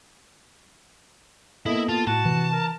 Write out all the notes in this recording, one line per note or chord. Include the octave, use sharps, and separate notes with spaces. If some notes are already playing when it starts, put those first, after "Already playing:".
A#3 B3 E4 A4 D#5
F4 A5
A2 F#4 A5
C3 E3
A#4